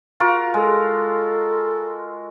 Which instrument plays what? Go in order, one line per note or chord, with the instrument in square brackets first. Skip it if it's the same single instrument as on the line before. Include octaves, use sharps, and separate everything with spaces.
[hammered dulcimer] F4 F#4 A#4
[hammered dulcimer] G#3 [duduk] A4